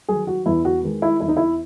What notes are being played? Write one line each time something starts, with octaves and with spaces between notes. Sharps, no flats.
D#3 F#3 G#4
F#4
E2 E4
F#4
D#3 G#3
E4
E2 E4
D#4
E4